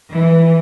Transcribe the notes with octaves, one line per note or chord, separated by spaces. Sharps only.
E3